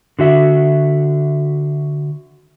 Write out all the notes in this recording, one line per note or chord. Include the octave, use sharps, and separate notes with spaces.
D3 F#4 E5